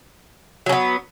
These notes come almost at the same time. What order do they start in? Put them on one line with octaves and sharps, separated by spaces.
F#3 C#4 B3